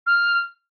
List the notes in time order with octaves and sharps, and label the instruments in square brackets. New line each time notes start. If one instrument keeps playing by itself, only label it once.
[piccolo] F6